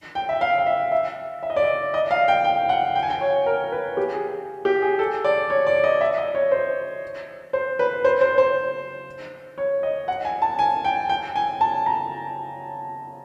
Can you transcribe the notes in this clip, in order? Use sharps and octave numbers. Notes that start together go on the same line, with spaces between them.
G5
E5
F5
F5
E5
E5
E5
D#5
D5
D#5
D#5
F5
G5
G5
F#5
G5
G#5
G5
C#5
A#4
A#4
B4
G4
G#4
G4
G#4
A4
D5
C#5
D5
D#5
E5
D#5
C#5
C5
C5
B4
C5
C5
C5
C#5
D#5
F#5
G#5
A5
G#5
G5
G5
G#5
A5
A#5